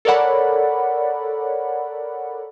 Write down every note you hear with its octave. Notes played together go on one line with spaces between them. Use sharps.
A4 A#4 C#5 D5 F#5 B5